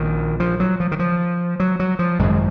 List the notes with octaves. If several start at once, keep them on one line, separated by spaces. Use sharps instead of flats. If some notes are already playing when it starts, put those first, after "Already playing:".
Already playing: A#1 A#2 D#3
F3
F#3
F3
D#3
F3
F#3
F#3
F3
G#1 F#2 C#3 G#3